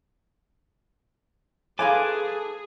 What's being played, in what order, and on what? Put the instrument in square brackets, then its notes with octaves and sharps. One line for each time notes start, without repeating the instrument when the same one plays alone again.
[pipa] D#4 F5 C6 [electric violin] G#4 [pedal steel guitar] A4 B4 D6 [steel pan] G#5